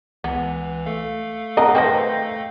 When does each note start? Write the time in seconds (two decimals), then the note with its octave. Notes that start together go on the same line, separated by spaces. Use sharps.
0.24 C#2 E3 B3
0.86 A3 A4 F5
1.57 C4 A#4 D#5 F#5 A5 A#5
1.75 D#3 B4 C5 G5 A#6